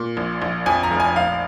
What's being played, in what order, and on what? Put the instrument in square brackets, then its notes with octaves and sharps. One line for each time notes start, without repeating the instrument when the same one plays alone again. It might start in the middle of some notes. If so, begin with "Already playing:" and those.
Already playing: [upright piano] A#2
A#1
A#1
F2 G#5
A#5
F1
G#5
A#1 F5